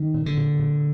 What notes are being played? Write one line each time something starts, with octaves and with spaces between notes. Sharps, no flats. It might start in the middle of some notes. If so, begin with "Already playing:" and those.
Already playing: D#3
A#2
D3
A#2
A#2